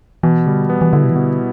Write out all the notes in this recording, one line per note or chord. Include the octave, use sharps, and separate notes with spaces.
B2 E3
D3 G3
E3 B3
E3
D3 E4
C3
E3
B2 D3